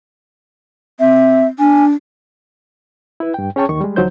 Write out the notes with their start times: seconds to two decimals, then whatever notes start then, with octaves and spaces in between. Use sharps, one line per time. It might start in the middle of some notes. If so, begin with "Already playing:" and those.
1.00 C4 E5
1.59 D4 G#5
3.20 E4 B4
3.34 G2 G5
3.56 C#4 G#4 C#5 G5 A5 C#6
3.69 D#2 D#3 C#6
3.81 G3 G#3
3.96 D2 F3 F#3 D#4 C5 G6